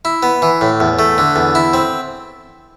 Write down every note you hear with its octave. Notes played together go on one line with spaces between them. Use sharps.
E4
B3
E3
A2
E2
A3
D3
E2
E4
C4